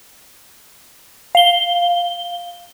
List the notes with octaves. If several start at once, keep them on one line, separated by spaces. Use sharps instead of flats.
F5 G7